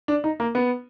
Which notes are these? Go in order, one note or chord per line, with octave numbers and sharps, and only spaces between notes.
D4
D#4
A#3
B3